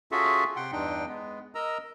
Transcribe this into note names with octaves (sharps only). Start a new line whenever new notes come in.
C#4 F4 F#4 G#4 A4 E5
C3 F#5 G5 C6
E2 G2 D4 D#4 G5
G#3 B3
A#4 D#5 A#5 E6